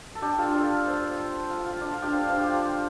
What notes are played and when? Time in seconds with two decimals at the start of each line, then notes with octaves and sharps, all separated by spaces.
0.15 A4
0.22 D4 G4
0.38 F4 A4
0.54 A4 D5
0.86 C5 F5
1.50 F4
1.65 F4
1.81 D4
1.91 F4
2.02 D4 G4
2.13 C5 F5
2.29 C5 F5
2.39 G4
2.45 F4